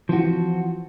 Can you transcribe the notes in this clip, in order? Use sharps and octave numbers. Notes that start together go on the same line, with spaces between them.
E3 F3 C4 F4 F#4